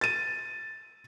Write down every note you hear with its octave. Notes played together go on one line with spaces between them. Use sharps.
A6 D#7